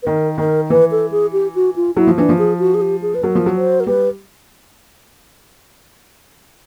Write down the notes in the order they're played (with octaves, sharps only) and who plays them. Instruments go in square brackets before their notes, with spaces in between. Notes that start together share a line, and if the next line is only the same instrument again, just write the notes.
[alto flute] B4
[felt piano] D#3 [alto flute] A#4
[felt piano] D#3 [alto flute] A#4
[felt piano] E3 [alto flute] B4
[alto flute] A4
G#4
G4
F#4
F4
[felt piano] F#3 [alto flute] E4
[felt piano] F3
[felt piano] E3 [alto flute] D4
[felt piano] F3
[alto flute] G#4
F#4
G#4
G4
G#4
B4
[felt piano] F#3 [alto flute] A#4
[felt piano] F3
F#3
[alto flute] C5
A#4
[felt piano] G3 [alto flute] B4